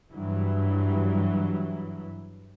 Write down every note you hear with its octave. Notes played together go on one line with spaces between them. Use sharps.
G2 E3 F#3